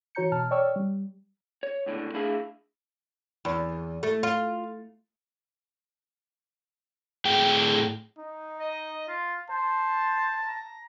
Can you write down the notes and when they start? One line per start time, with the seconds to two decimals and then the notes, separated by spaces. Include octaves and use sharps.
0.15 E3 F#4 C#5 A#5 G6 C#7
0.32 B2 A5 F6
0.51 C#5 D5 G5 C#6 E6 F6
0.76 G3
1.63 C#5
1.86 C#2 A2 D3
2.14 A3 D4 E4 G#4 E5 F5
3.45 E2
4.03 A3
4.23 F4
7.25 A2 G#4 G5
8.18 D#4
8.59 D#5
9.08 F4
9.50 C5 A5
10.47 A#5